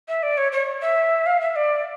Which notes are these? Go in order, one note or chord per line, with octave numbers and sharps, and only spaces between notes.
E5
D5
C#5
C#5
E5
F5
E5
D5